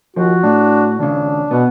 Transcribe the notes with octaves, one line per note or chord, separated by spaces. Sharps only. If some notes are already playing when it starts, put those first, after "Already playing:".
D#2 F3 F#4
A2 D4
D#2 C#3 D4
B2 B3